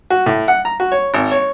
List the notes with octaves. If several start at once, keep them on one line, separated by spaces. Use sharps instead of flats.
F#4
A2
F#5
A#5
F#4
C#5
G#1
C#5